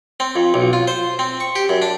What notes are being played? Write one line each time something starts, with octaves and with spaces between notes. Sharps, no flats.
C4
F2
B1
F4
C5
C4
C#6
G4
F#2
D4